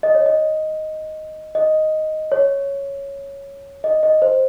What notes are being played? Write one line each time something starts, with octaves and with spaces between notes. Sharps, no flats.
D#5
C#5
D#5
D#5
C#5
D#5
D#5
C5